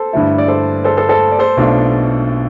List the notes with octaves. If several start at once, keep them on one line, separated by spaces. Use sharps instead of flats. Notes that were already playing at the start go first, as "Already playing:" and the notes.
Already playing: A4 C5
G2 D3 A3 E4
D5
A4 C5
A4 C5
A4 C5
A4 C5
D5
A4 C5
B1 B2 A3 D4 F4